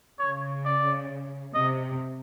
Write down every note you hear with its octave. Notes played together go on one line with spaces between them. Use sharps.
C#3 C#5
D5
C3 D#5